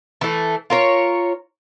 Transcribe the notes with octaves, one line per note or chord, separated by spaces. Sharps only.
E3 A3
F4 A#4 C#5